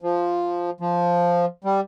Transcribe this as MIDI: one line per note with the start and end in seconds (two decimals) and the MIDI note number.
0.02 0.70 53
0.80 1.45 53
1.64 1.80 55